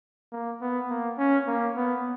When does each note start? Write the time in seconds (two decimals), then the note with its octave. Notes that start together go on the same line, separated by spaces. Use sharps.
0.32 A#3
0.61 B3
0.90 A#3
1.18 C#4
1.48 A#3
1.77 B3